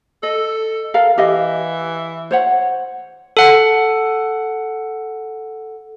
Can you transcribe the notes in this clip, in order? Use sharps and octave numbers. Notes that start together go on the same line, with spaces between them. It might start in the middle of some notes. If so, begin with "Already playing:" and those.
A4 D#5
A4 A#4 F5
E3 G4 D#5 F5
C5 C#5 F#5
A4 F#5